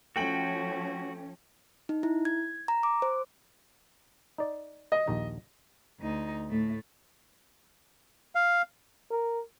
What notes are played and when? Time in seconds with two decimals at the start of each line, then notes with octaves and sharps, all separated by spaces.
0.16 F3 A3 C#4 F#4 G5 F#7
1.89 D#4
2.03 E4
2.25 G#6
2.68 A#5
2.83 D6
3.02 C5
4.38 D#4 D5
4.92 D#5
5.07 A#1 D#2 D#4
6.00 D2 D#4
6.50 A2 A3
8.35 F5
9.11 A#4